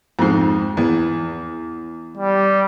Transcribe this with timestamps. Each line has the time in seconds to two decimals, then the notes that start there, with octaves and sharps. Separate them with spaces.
0.19 F2 G#2
0.77 E2
2.17 G3